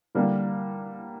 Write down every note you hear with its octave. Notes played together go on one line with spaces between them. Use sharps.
D3 G3 A#3 D4